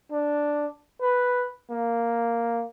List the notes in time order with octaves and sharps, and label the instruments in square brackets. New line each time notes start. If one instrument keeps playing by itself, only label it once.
[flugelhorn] D4
B4
A#3